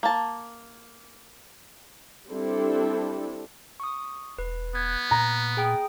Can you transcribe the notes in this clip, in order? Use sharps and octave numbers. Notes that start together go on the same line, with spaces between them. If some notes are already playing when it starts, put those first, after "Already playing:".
A#3 A5
G3 C4 D4 E4 A4
C#6 D#6
E1 B4
B3 F#6 G#6
A#2 A#5
G#4 G5 D#6